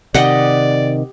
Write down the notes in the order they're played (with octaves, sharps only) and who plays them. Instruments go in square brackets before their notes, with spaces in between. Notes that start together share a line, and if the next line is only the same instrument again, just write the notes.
[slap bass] C3 D#3 [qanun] G4 D#5 F#5 [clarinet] D5